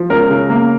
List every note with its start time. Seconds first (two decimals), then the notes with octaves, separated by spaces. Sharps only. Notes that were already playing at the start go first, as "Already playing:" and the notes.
Already playing: F3
0.10 C#2 A#4
0.30 C#3
0.50 A#3